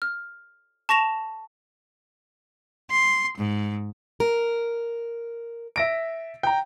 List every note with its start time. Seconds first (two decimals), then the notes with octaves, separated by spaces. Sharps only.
0.02 F6
0.89 A5 C#6 A#6 E7 F7
2.90 C6
3.37 G#2
4.20 A#4
5.76 E5 A#6 D7
6.43 G5 A#5